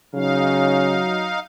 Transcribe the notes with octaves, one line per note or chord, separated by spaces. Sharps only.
C#3 F#3 D#4 F5